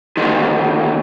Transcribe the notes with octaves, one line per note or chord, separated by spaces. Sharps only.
D2 D#3